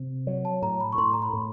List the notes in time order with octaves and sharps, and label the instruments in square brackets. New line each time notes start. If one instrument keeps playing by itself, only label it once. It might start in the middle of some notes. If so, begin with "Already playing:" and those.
Already playing: [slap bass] C3
F#3
[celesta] A5
[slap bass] A2 [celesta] A#5
[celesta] B5
C#6
[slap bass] A2 [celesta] C6
[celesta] A#5
B5
[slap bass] A2